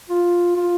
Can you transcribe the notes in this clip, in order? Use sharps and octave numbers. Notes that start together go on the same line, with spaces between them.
F4
F4